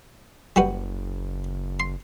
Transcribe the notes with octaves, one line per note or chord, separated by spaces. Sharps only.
F#1 G3 F#4 B4
C6